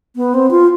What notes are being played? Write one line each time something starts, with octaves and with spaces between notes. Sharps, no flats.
B3
C4
F4